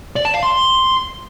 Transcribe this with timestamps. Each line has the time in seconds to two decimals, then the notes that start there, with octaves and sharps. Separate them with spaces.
0.16 D5
0.25 A5
0.34 F5
0.43 C6